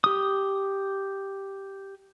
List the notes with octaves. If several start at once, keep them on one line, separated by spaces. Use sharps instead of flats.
G4 D#6